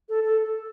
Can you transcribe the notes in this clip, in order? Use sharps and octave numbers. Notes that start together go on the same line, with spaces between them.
A4
A4